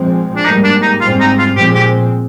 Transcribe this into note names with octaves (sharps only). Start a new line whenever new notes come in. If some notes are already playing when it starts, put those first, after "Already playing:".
Already playing: A#2 F3 G#3 C4
D4
G#2 G3 A#3 D#4
D4
D#4
G#2 G3 C4 F4
D#4
F4
A#2 F3 G#3 C4 G4
G4